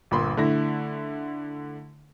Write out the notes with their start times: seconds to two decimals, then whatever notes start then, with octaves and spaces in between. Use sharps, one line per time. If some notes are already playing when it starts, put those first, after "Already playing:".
0.11 G1 A#2 B5 C6
0.37 D3 A3 E4 A#6